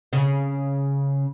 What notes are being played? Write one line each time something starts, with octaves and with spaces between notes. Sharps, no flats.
C#3